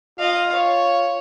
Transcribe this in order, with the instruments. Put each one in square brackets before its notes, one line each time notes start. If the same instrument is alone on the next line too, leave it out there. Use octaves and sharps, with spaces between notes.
[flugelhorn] F4 [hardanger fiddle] D#5 F5
[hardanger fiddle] C#5